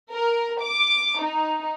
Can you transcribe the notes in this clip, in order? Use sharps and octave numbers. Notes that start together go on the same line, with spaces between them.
A#4
D6
D#4